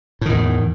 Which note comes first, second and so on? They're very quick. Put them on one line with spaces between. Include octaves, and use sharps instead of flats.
A2 D#3 E2